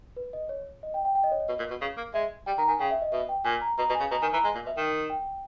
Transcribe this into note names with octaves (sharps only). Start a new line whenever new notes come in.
B4
D#5
C#5
D#5
G5
G5
G5
D#5
C#5
D#5
B2
A#2
B2
C#3
A#3
G#3 E5
G3 G5
D#3 A#5
D#3 G#5
C#3 G5
E5
D#5
B2 E5
G5
A#2 G#5
A#5
B2 A#5
B2
G#5
C#3
B2 A#5
D#3 G#5
E3 A#5
G#3 G#5
A#2
B2 E5
D#3 G5
G5